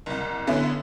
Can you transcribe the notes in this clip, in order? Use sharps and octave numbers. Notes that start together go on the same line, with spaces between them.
F#1 C2
D3 B3 C#4 E4